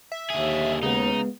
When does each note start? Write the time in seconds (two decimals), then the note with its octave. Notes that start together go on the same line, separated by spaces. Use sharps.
0.12 E5
0.30 D#2 D3 G#4
0.83 C#3 G#3 B3 D#4